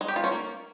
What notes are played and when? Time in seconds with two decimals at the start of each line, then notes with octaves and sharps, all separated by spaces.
0.01 G#3
0.08 G4
0.16 F4
0.24 C#4
0.31 A#3